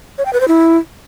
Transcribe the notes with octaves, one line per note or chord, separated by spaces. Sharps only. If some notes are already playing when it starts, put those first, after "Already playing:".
C#5
G5
B4
C5
E4